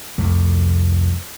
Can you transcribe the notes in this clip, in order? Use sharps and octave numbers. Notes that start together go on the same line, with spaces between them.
C2 F2 A3